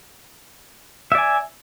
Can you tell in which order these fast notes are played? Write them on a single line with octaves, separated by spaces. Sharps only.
E5 D5 G#5